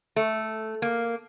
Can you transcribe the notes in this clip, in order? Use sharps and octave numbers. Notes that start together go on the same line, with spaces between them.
A3
A#3